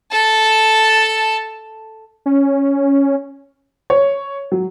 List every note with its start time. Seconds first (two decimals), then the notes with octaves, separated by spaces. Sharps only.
0.11 A4 A5
2.26 C#4
3.90 C#5
4.52 F#3